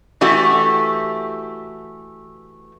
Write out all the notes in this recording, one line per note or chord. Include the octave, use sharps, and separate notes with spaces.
E3 A3 F#4 G4